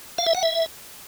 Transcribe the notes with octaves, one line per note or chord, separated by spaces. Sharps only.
F5
E5
F#5
E5